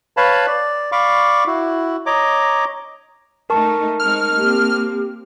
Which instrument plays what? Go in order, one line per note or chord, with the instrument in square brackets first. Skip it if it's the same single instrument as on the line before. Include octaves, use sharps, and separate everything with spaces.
[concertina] B4 C#5 F5 A5 B5
D5
D5 F5 B5 C#6 D6
E4 F#4
C#5 D#5 A#5 D6
[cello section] A3 D#4 [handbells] A#4 A5 C#6
[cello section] G#3 C4 D#4 [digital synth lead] F6
[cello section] A#3 C4 [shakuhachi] G4